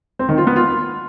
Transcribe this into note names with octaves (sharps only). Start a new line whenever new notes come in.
C4
D#3
F4
B3
F4